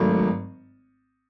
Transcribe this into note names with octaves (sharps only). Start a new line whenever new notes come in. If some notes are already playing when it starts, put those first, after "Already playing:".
Already playing: G#1 G#2 F#3 A3